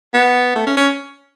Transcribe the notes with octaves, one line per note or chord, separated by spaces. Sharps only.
B3
A3
C#4
C#4